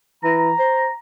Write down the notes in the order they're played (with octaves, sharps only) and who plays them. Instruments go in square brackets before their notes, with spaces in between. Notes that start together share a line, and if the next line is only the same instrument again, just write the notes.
[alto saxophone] E3 [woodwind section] A#5
[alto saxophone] C5